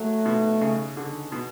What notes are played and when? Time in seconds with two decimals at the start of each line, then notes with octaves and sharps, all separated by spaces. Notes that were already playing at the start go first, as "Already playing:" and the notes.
Already playing: F#3 A3
0.25 B2
0.61 C#3
0.97 D3
1.32 B2